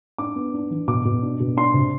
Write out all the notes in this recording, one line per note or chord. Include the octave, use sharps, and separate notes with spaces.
D4 D6
B3
D4
E3
B2 D6
B2
D4
B2
D4 C6
C3